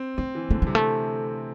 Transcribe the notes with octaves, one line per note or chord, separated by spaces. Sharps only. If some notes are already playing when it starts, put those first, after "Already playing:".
Already playing: C4
A3 C4
E3
D3 A3
C3 G3
A3